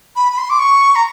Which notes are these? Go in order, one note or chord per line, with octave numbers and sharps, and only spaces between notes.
B5
B5
C6
D6
C#6
A#5